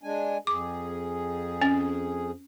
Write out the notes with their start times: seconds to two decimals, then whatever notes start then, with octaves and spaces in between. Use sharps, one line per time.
0.03 G#3 D4 G#5
0.47 F2 G#4 D6
1.62 C#4